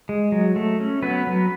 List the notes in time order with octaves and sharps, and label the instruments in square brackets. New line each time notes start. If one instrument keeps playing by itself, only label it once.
[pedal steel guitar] G#3
F#3
A3
C#4
F#3 B3 B4
F#3